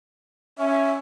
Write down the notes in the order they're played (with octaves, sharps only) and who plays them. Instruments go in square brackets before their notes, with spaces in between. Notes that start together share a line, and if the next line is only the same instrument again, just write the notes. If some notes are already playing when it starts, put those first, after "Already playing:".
[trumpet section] C#4 [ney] E5